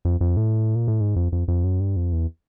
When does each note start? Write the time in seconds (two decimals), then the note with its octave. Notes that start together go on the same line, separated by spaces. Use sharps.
0.05 F2
0.21 F2
0.37 A2
0.75 A#2
0.88 A2
1.00 G#2
1.16 F2
1.32 F2
1.48 F2
1.64 F#2
1.80 G2
1.96 F2
2.12 E2